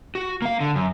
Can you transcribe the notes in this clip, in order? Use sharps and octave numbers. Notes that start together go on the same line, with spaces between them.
F#4
A#3 F5
D3
F#2